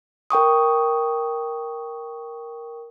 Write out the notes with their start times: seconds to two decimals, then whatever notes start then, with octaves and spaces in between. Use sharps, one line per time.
0.30 A#4 G5 C#6 D#6